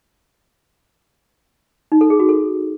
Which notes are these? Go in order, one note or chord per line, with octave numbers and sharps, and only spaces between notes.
D#4
A4
G#4
F#4
A4